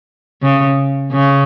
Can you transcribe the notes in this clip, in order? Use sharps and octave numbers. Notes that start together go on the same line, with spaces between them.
C#3
C#3